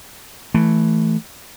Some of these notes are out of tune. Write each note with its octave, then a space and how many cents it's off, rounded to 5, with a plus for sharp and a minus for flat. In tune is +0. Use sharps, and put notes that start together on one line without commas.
E3 +0 A3 +0